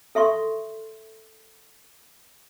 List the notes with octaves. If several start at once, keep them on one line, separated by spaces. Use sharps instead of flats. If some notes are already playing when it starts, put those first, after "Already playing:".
A4 E5 C6 C#6